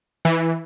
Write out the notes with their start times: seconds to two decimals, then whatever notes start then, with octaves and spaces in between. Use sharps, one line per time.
0.25 E3